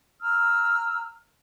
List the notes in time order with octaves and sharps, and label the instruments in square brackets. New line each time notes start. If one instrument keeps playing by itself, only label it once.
[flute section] A#5 E6 F6